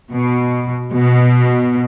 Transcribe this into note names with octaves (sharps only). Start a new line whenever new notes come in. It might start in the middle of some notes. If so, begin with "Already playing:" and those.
B2
B2